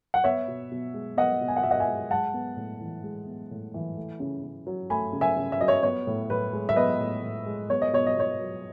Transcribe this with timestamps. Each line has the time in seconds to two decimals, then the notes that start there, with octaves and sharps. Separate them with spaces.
0.14 F#5
0.24 B3 C#5 E5
0.48 B2
0.71 B2
0.94 G#3
1.17 B3 D#5 F#5
1.41 B2
1.48 G#5
1.57 F#5
1.63 B2 E5
1.71 D#5 F#5
1.80 E5 G#5
1.88 G#3
2.11 G#3 F#5 A5
2.34 B3
2.57 A2
2.81 E3
3.04 G#3
3.27 B3
3.51 A2
3.74 E3
3.97 A3
4.20 C#3
4.44 C#3
4.67 F#3
4.90 A3 G#5 B5
5.13 C#3
5.21 E5 G#5
5.37 C#3
5.52 E5
5.60 F#3 D#5
5.68 C#5 E5
5.83 B3 C#5
6.07 A2
6.30 A2 B4
6.53 G#3
6.69 E5
6.76 B3 B4 D#5
7.00 A2
7.23 A2
7.46 G#3
7.70 B3 C#5
7.82 D#5
7.93 B2 C#5
8.06 D#5
8.16 B2 C#5
8.40 F#3